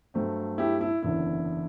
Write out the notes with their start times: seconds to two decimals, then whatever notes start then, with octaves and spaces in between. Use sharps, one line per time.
0.14 G2 F#3 A3 C4
0.58 E4 G4
0.81 E4
1.03 F#1 E2 D3 E4